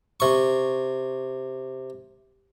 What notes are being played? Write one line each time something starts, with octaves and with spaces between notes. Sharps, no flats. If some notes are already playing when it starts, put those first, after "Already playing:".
C3 C#6